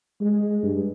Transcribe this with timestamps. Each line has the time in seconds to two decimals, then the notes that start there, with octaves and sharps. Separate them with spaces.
0.21 G#3
0.63 G2